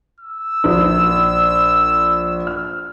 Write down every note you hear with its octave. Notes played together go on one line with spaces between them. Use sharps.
E6
A#1 A#2
F6